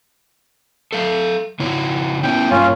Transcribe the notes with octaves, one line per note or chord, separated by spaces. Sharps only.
A4 E5 F5
C#3 E4 C#5
B3 C#4 E4 G5
G2 A#3 C#4 F4